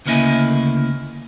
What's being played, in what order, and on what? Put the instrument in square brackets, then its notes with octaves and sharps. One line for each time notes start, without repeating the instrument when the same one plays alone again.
[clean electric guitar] D2 C#3 A#3 E4 D#5 G#5